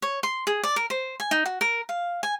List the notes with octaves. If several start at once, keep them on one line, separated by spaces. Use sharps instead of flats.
C#5
C6
G#4
D5
A#4
C5
G#5
D#4
F#4
A#4
F5
G#5